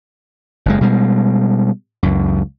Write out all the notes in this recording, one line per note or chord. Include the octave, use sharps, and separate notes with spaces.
F#1 F2 G#3
B2 G3 G#3
C#2 F#2